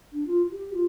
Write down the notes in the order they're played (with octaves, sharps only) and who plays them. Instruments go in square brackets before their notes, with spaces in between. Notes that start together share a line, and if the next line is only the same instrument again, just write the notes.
[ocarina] D4
F4
G4
F4